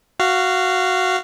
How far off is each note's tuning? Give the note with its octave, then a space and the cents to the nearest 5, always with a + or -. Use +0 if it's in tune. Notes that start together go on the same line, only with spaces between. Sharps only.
F#4 +0 F5 -15